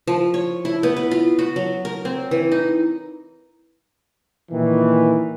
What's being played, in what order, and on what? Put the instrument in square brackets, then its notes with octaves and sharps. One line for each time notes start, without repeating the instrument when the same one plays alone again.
[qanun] F3
C#5
E4
B3
B4
F4
F#4
F#3
A#4
C4
E3
D#4
[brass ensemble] A#2 D#3 E3